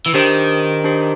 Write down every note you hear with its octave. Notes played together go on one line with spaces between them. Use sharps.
E3
D#3 D4 G4 C5
D4 G4 C5